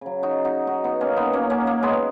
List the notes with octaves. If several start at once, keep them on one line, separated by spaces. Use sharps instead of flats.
C#3 F#3
D#4 F#4
D#4 F#4
D#4 F#4
B3 D#4
A#3 C#4
B3 D#4
A#2 F#3 A#3 C#4
A#3 C#4
A#3
G#3 B3